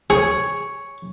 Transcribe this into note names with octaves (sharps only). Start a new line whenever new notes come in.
G#4 C#5